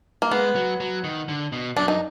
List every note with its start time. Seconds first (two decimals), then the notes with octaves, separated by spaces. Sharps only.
0.22 A#3
0.31 G#3 B3
0.56 F#3
0.80 F#3
1.04 D#3
1.29 D3
1.52 B2
1.76 F#2 D4
1.88 D#4